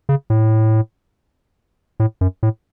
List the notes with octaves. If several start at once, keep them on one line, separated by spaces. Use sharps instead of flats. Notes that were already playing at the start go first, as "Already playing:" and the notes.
C#3
A2
A2
F#2
A2